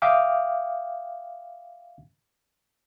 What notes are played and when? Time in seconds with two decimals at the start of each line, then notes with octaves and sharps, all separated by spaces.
0.02 E5 F5 G5 D6 D#6 F6